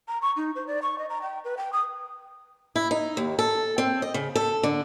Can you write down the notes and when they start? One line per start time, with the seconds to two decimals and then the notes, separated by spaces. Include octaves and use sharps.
0.08 A#5
0.22 C#6
0.37 D#4
0.56 C5
0.67 D5
0.82 C#6
0.98 D#5
1.10 A#5
1.22 G5
1.44 B4
1.57 G5
1.73 D#6
2.76 E4
2.91 D#4
3.17 D#2
3.39 A4
3.78 C4
4.02 D#5
4.14 C#3
4.35 A4
4.63 D3